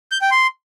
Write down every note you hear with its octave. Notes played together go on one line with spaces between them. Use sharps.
G6
G5
C6